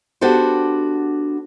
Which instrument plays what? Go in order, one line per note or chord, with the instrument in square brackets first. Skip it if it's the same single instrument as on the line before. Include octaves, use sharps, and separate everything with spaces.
[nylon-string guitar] B3 D4 F#4 G4 A4 C5